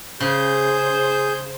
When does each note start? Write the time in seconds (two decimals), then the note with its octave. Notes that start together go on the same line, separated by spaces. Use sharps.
0.20 C#3 G#4 C5 G6